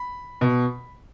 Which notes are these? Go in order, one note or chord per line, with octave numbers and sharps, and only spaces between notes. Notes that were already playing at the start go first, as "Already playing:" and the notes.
Already playing: B5
B2